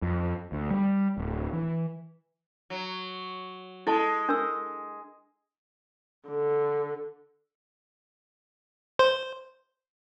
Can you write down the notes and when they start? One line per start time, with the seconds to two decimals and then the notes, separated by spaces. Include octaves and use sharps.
0.02 F2
0.52 D2
0.71 G3
1.18 D1
1.53 E3
2.70 F#3
3.87 G#3 E4 A4 A5
4.29 D4 A#4 E6
6.29 D3
8.99 C5